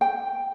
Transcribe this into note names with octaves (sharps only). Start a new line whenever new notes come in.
G5